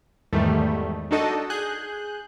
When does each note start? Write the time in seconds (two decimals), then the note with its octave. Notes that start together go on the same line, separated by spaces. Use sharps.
0.33 E2 G#2 D#3 G3 A3
1.11 D4 D#4 F#4 A4 D#5 A5
1.50 G#4 F#6 G6